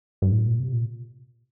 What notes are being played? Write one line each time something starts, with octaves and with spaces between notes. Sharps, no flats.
G2
A2
A#2
C3
A#2